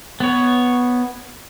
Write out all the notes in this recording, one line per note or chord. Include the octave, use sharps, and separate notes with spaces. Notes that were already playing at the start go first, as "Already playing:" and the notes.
B3 C#5